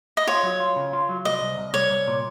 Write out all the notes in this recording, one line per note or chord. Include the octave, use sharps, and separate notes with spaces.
D#5
F4 C#5
F#3
F4
C#3
F4
F#3
C2 D#5
C2
C2
C2 C#5
C2
A#2